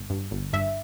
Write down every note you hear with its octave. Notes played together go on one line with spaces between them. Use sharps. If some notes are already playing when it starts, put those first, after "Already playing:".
Already playing: G1
G2
G1
G2 E5